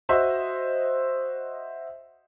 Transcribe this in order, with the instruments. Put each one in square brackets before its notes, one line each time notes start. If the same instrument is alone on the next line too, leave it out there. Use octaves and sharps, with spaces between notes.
[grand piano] F#4 C5 D#5 E5